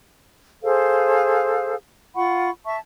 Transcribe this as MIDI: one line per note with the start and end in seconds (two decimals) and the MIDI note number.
0.63 1.75 68
0.63 1.75 69
0.63 1.75 72
0.63 1.75 77
2.15 2.50 65
2.15 2.50 78
2.15 2.50 83
2.15 2.50 85
2.65 2.78 76
2.65 2.78 81
2.65 2.78 85